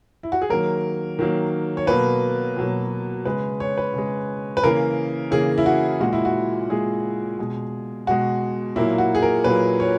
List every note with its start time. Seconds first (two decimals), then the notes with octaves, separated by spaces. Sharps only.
0.23 E4
0.32 F#4
0.42 G#4
0.50 D#3 F#3 A#3 A#4
1.19 D#3 F#3 A#3
1.77 C#5
1.87 B2 F#3 A#3 B4
2.56 B2 F#3 A#3
3.25 C#3 G#3 B4
3.60 C#5
3.78 B4
3.94 C#3 G#3
4.57 B4
4.63 C#3 E3 A#3 A#4
5.31 C#3 E3 A#3 G#4
5.58 E4
5.66 F#4
6.00 A#2 G#3 F#4
6.13 E4
6.25 F#4
6.69 A#2 G#3 G#4
7.39 B2 G#3
8.07 B2 G#3 F#4
8.76 A#2 F#3 A#3 E4
8.98 F#4
9.15 G#4
9.23 A#4
9.44 A#2 F#3 A#3 B4
9.80 C#5